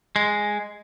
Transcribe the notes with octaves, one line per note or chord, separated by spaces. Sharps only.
G#3